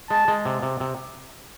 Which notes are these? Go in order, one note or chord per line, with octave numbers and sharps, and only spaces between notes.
G#3 A5
G#3
C3
C3
C3